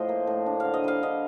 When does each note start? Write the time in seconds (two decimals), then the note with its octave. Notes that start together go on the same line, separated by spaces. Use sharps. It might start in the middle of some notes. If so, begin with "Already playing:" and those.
Already playing: A2 F3 C5 D#5
0.09 A#3
0.27 A2
0.46 D4
0.60 D3 F5
0.74 D#5
0.84 G3 F5
1.03 D3 D#5